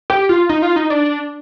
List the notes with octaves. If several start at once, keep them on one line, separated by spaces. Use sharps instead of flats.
G4
F4
D#4
F4
D#4
D4